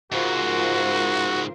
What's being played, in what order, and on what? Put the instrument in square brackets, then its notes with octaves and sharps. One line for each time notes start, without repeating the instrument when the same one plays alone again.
[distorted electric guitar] G#2 C#3 [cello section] F4 A#4 C5 [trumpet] F#4